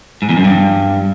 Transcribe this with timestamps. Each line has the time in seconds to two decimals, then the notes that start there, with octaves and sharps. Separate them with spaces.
0.22 G#2
0.29 E2
0.37 F#2
0.44 G2